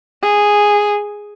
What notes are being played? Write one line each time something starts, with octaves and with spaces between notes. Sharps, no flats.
G#4